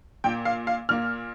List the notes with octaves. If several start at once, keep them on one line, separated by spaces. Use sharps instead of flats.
A#2 A#3 G5
F5
F5
A#2 A#3 F6